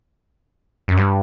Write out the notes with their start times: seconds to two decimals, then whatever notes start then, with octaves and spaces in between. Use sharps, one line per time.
0.88 F#2
0.97 G2